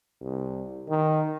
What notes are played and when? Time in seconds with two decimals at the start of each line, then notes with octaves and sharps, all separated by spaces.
0.21 C2
0.89 D#3